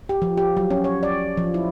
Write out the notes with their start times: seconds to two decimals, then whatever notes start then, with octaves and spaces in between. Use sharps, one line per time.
0.09 G4
0.22 F3
0.37 G4
0.57 F#3
0.70 C#4
0.84 C#5
1.03 D5
1.37 F3
1.54 E4